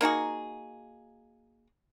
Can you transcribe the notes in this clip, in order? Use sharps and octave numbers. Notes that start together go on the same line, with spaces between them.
A#3 D#4 F#4 G#4